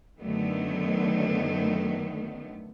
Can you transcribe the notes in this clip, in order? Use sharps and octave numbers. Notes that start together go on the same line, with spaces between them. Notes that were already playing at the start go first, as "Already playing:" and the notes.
F#2 D3 D#3 F#3 A3 B3